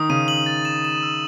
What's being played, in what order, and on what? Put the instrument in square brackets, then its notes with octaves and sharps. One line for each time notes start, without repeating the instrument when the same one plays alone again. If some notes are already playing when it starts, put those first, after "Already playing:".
Already playing: [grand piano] D#3 [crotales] D#6
[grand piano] C#3 [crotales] D#7
[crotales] F#7
A6
E7
E7
E6